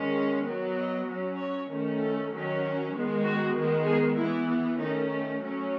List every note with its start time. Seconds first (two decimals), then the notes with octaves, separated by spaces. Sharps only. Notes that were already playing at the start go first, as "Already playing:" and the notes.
Already playing: D#3 G#3 C#4
0.45 F#3 B3
0.76 D#5
1.07 F#3 C#4
1.38 C#5
1.69 D#3 A3 C#4
2.00 A4
2.31 D#3 F#3 C#4
2.93 D#3 G#3 B3
3.24 F#4
3.54 D#3 G#3 B3
3.86 G#4
4.16 E3 B3 E4
4.78 D#3 A3 C#4 D#4
5.40 F#3 A3 C#4